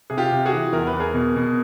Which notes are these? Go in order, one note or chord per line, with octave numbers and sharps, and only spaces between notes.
C3 G#4
F4 G4
C3
F#4 G#4
E3
E2 A#4
B4
E2
G#4 A#4
B2
B2